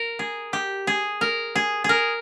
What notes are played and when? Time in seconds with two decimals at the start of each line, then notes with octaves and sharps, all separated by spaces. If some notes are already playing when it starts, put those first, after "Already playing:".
Already playing: A#4
0.19 G#4
0.53 G4
0.87 G#4
1.21 A#4
1.55 G#4
1.84 G#4 A#4